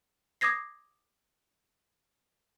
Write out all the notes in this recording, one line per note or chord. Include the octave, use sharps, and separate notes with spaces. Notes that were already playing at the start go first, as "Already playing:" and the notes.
D6 D#6 G#6 A#6 C7